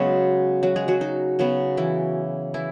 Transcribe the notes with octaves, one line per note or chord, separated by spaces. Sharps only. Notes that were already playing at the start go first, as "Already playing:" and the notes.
Already playing: C#3 F#3 G#3 B3 F#4
F#3 F#4
G#3 G#4
F#3 F#4
D#4
C#3 F#3 B3
E3 E4
E3 E4